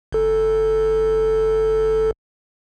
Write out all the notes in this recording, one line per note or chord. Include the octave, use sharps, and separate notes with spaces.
G1 A4